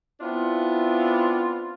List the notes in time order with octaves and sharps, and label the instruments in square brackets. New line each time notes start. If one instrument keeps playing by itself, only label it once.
[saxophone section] B3 C4 D4 E4 F4